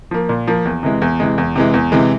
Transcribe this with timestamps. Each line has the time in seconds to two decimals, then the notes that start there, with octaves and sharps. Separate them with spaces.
0.11 F3 A#3
0.29 A#2
0.47 F3 A#3
0.66 E2
0.83 C3 E3 G#3
1.02 E2
1.20 C3 E3 G#3
1.38 E2
1.56 C3 E3 G#3
1.74 E2
1.92 C3 E3 G#3